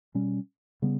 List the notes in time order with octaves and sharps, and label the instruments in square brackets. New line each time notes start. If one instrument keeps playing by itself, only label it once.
[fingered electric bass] B2 G3 C#4
C#3 G3 B3